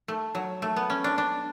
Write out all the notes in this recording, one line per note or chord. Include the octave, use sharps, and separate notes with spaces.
A3
F#3
A3
B3
C#4
D4
D4